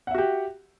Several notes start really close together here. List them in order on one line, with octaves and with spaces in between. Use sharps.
F#5 E5 F#4 G4